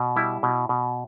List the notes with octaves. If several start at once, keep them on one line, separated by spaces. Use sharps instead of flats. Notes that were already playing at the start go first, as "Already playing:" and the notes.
Already playing: B2
G3 E4
B2
B2